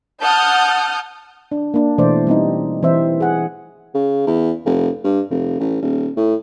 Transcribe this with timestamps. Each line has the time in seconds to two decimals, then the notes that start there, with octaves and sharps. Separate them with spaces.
0.22 F#5 A5 D#6 F6 G6
1.52 D4
1.74 A#3 D4
1.98 B2 E3 A3 D4 C5 D5
2.27 G3 C4 D#4
2.83 E3 C4 C5 E5
3.20 G#4 F#5
3.94 C#3
4.27 E2
4.65 F1
5.04 G2
5.31 F1
5.59 A1
5.81 D#1
6.17 A2